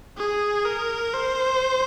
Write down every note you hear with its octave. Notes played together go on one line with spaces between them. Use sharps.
G#4
A#4
C5